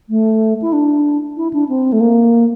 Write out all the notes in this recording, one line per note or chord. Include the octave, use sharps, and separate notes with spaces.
A3
E4
D4
E4
D4
C4
A3
A#3